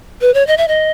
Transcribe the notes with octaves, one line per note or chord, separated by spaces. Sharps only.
B4
C#5
D#5
E5
D#5